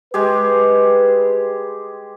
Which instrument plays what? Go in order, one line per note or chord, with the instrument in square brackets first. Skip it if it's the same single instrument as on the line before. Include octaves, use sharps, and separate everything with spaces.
[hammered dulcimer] G#3 G4 G#4 [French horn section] B4